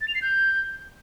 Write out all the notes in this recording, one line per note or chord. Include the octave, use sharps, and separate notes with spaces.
A6
F7
C7
G6